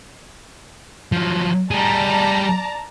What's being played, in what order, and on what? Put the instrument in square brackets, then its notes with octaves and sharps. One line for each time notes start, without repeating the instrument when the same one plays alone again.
[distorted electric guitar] F3 F#3
[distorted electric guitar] G3 G#4 [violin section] D5 A5 A#5